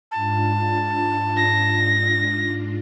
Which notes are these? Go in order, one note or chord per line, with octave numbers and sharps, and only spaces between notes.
G#2 D4 F4 A5
A#6